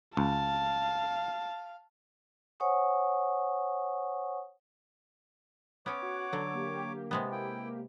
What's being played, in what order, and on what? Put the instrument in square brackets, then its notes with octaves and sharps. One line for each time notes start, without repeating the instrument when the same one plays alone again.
[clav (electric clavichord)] C#2 [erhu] F5 [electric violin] A5
[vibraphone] C5 C#5 F#5 G#5 C#6 D#6
[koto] B3 C#4 [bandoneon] C#5 D6
[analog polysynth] F#4 F#5
[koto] D3 F#3 [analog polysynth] A4
[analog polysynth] A#3 G4
[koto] C3 G#3 B3
[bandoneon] E4 G5